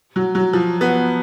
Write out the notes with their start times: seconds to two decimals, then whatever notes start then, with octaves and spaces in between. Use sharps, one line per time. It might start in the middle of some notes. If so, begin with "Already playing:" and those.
0.16 F#3
0.35 F#3
0.53 F3
0.81 B3